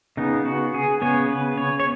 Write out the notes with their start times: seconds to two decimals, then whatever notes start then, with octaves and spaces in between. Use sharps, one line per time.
0.17 C#3 B3 D#4
0.45 F#4
0.74 G#4
1.02 C#3 B3 C#5
1.30 B4
1.57 C#5
1.80 C#5